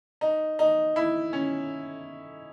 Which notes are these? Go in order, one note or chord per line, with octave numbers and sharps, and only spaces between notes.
D#4
D#4
E4
C#4